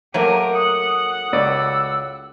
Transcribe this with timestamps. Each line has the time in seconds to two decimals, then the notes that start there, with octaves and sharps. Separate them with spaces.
0.14 F#3 A3 A#3 G4 A#4 D#7
0.54 F#5 D#6
1.33 C#2 D5 E6